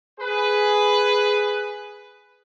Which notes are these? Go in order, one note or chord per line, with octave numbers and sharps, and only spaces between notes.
G#4 B4